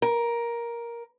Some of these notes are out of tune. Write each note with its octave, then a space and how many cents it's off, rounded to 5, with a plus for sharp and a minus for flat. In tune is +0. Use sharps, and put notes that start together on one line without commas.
A#4 +10